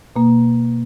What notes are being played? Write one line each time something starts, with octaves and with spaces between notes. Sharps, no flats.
B2 A#3